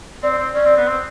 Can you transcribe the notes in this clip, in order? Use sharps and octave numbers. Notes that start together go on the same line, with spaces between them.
C4 D5
C4
C#4 D5
C4
B3
C4